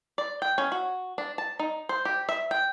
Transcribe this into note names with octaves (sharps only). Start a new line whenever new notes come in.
D5
G5
C#4
F#4
D4
A5
D#4
C5
G4
E5
G5